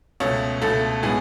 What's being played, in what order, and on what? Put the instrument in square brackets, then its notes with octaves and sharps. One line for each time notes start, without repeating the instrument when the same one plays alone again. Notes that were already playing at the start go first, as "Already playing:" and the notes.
[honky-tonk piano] C#2 B2 A3 C#5
C#2 B2 A3 A4
A2 G#3 B3 G#4